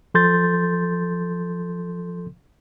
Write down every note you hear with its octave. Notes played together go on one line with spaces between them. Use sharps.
F3 A4 C6 G6 A6